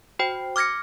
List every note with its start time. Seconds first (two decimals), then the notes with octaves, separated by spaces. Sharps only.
0.19 F#4 C5 G5
0.56 D6 F6 G#6 A#6 C#7